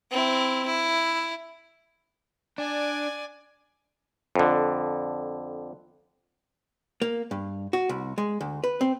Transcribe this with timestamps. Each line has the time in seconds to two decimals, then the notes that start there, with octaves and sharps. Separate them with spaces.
0.11 C4 E4
0.66 E4
2.58 D4 D5 G#5
4.35 F2 D3
7.02 A#3
7.31 G2
7.73 F#4
7.89 C2
8.18 G#3
8.41 D2
8.64 B4
8.81 C4